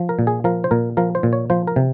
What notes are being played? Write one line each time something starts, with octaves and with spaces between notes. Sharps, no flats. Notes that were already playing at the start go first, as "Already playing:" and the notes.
Already playing: F3
A#4
A#2
G#4
F3 A#4
C5
A#2 A#4
F3 A#4
C5
A#2
C#5
F3 C5
A#4
C3